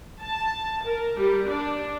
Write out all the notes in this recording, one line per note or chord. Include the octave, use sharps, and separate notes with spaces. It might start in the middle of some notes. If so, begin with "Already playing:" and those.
A5
A#4
G3
D4